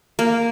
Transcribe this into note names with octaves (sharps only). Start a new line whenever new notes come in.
A#3